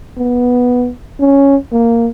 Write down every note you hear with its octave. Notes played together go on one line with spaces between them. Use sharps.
B3
C#4
A#3